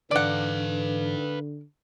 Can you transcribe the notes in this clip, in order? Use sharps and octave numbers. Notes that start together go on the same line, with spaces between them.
G#2 D3 E3 B4 D5 F5 F#5